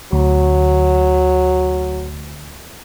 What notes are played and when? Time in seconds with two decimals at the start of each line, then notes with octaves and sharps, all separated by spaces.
0.12 D2 F#3